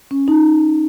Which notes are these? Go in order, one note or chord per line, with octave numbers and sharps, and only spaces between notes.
C#4
D#4